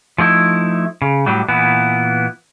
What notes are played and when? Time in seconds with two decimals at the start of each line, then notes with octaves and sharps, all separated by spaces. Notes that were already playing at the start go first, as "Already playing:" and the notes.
0.18 F3 A3 D#4 E4
1.02 C#3
1.26 A2 F#3 G3
1.48 A#2 E3 B3 E4